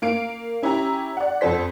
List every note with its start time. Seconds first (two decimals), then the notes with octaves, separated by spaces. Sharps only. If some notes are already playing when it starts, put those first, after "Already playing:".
0.02 A#3 F5 D7
0.62 C#4 E4 G4 G5 A#5
1.17 D5 F#5
1.41 F2 A4 C5 B6